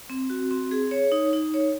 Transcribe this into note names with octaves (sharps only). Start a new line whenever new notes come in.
C4
F#4
C4
G#4
C#5
D#4
D#4
C#5